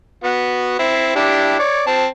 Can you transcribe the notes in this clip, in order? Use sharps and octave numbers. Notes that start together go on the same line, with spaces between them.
B3 F#4
C4 E4
D4 E4 G4
C#5 D5
C4 A5